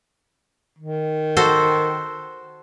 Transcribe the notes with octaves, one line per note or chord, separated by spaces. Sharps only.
D#3
F#4 A4 C5